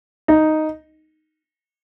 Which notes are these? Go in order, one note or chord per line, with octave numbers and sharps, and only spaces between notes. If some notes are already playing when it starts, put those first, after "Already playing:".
D#4